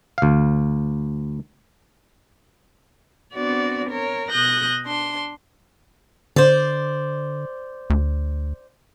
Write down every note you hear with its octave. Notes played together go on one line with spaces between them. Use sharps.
D2 F5
B3 C4 D4 F#4 D5
A#4 C#5
B2 D#6 F#6 G6 A#6
D4 C6
D3 C5 D5
D2